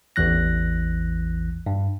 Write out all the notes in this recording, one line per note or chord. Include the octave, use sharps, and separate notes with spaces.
A1 E2 E3 F#6 A#6
G2